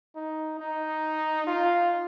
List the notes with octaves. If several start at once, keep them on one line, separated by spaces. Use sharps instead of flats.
D#4
D#4
F4